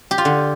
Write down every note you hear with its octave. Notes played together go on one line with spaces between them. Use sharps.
G4
F4
D3